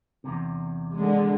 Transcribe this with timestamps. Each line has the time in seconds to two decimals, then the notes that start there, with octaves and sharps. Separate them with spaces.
0.24 E2 G2 C3
0.94 D3 G#3